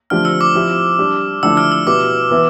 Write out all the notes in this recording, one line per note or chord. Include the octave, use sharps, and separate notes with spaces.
D3 F3 A3 C4 G4 F6
E6
D6
F3 C4 E4 G4
G3 D4 G4
D3 F3 A3 E4 E6
F6
E6
B2 B3 E4 G4 D6
E3 B3 E4